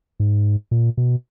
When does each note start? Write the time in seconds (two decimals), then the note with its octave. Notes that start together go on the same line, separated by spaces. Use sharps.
0.20 G#2
0.71 A#2
0.97 B2